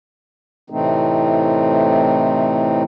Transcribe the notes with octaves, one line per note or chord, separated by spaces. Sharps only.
A2 C3 E3 A3 C4 D#4